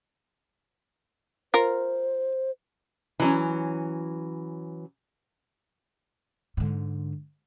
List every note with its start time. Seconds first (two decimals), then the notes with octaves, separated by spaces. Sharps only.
1.54 F4 A#4 C5
3.20 E3 F#3 C#4
6.57 G#2 D3